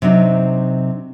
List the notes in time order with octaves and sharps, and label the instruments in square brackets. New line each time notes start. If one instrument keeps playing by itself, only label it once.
[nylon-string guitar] C3 F#3 C4 D4 D#4